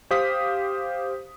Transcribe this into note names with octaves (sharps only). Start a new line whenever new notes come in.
G4 C5 F5 D#6 B6